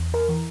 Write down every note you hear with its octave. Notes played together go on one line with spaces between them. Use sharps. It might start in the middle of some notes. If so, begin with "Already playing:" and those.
Already playing: E2
A#4
E3